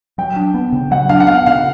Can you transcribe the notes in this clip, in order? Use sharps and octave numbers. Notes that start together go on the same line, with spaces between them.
F#3 G5
D4
B3
C#3
F#3 F#5
D4 F5
F#5
B3 F5
C#3 F5